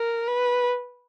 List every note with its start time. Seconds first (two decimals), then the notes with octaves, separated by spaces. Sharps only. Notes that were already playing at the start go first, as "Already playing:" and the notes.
Already playing: A#4
0.27 B4